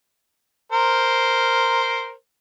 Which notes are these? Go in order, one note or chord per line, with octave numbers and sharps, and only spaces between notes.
A#4 C5